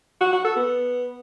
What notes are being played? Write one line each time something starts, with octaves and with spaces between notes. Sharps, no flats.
F#4
F#4
A4
B3